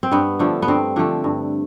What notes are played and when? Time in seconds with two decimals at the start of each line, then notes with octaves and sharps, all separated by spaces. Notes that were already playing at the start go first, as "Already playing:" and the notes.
0.03 C4
0.11 G2 B3
0.39 D3 F3 A3
0.62 B3
0.68 G2 C4
0.96 D3 F3 A3
1.24 G2